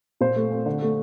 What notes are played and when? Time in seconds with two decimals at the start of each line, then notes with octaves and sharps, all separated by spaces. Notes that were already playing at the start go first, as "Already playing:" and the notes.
0.21 A#2 C5
0.36 A3
0.52 C4
0.66 D3
0.82 A3